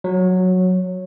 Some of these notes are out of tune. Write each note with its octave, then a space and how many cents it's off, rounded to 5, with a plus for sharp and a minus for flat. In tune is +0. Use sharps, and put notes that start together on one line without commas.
F#3 -10